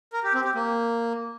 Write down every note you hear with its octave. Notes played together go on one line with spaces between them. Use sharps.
A#4
G4
C4
G4
A#3